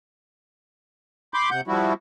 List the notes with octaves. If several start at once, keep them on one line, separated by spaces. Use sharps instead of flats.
B5 C6 D6 G6
C3 F#5 G6
F3 G3 E4 F#4